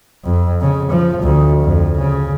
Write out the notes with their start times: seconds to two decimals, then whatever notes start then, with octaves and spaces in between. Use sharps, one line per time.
0.24 F2
0.61 C#3
0.91 F3
1.23 D2
1.62 F2
1.97 C#3